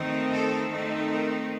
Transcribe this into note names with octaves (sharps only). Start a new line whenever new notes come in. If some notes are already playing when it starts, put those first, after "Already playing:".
Already playing: D#3 A3 C4 D#4
A4
D#3 A3 C4 D#4
A#4